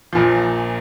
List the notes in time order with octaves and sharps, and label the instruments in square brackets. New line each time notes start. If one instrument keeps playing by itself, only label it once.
[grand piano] A#1 A#2 F3